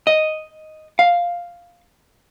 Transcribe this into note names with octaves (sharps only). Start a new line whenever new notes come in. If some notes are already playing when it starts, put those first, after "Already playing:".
D#5
F5